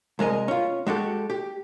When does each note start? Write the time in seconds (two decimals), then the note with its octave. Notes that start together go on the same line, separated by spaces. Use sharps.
0.19 C2 G#3 A#4 D#5
0.48 C#4 F4
0.87 G#3 F#4 G4 A4
1.30 G4